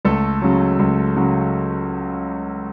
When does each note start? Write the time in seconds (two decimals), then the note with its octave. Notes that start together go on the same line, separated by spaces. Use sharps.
0.05 C#2 A3 A4
0.42 C#3 F#3
0.79 C#2
1.16 C#3 F#3